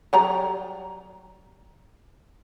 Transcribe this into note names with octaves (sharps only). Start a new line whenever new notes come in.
F#3 G3 A#5